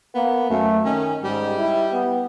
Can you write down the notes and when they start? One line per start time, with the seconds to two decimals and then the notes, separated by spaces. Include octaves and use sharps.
0.15 A#3 B3
0.50 F#2 A3
0.85 D#3 C#4
1.24 G#2 G3
1.58 E4
1.92 B3